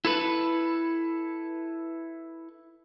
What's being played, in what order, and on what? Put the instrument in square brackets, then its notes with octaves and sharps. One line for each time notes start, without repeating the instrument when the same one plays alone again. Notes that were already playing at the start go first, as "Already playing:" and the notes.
[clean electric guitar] E4 A4 B4